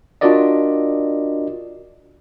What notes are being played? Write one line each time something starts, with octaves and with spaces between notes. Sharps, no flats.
D4 F4 F#4 A#4 D5 D#5